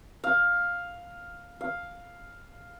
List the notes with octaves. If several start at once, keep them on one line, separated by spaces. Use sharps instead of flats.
F5
F5